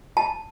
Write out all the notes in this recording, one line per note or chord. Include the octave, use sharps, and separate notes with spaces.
A5